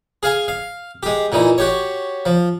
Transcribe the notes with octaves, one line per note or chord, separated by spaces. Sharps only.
G#4 F5 G#5
F5
G#3 G4
A#2 E3 D#4
F#4 G4 C#5
F3